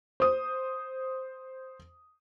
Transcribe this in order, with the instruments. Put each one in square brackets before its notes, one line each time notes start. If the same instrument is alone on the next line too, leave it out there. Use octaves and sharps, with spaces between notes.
[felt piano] C5 D#6